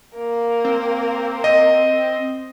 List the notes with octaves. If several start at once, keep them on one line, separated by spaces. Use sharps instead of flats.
A#3 A#4
C4
D#5